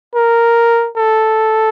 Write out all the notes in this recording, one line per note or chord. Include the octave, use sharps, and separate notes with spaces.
A#4
A4